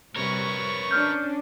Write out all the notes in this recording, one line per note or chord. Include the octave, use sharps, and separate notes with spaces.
C3 G3 A#4 B4 C#5 C#6
C#4 D4 F6 G6